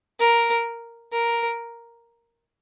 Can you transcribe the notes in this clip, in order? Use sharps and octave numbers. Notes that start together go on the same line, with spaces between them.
A#4
A#4